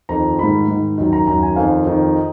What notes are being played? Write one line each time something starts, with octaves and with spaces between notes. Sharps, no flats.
F2 D#3 A#5
G#2 D#3 B5
G#2 D#3
F#2 D#3
A#5
F#2 D#3 A#5
G#5
F2 D#3 F5
F2 D#3
D#5